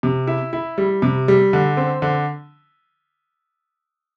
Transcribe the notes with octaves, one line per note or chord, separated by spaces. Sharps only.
C3
E4
E4
G3
C3
G3
D3
C4
D3